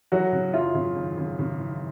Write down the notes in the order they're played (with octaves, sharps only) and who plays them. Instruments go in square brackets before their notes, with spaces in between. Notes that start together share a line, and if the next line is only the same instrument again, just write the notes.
[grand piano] E3 [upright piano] F#3 F#4
[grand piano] C#3
[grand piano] F#2 [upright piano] F4
[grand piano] C#3
G#1
C#3
C#3
E3